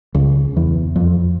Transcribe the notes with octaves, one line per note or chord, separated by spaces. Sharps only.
C#2
E2
F2